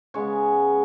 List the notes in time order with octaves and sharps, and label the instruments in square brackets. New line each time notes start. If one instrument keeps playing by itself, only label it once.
[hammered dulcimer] C#3 G#3 B3 C#5